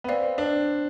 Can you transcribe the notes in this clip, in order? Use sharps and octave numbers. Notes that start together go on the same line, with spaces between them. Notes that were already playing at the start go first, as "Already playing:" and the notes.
B3
C4 B4 D5 F5
D4